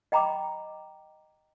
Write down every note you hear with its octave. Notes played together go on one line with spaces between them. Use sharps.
D#5 G5 A#5 B5 D6